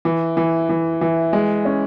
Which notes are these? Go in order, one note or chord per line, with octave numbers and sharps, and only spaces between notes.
E3
E3
E3
E3
G#3
C#4